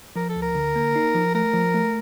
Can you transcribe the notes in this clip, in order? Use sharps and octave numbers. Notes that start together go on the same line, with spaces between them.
F3 A#4
A4
D2
A#4
D3
A#3
D#4
F3
A3 A#4
F3
A3